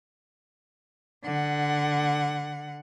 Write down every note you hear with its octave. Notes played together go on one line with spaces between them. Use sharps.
D3 F#5